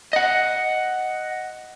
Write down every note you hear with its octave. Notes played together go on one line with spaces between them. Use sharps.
D#5 F#5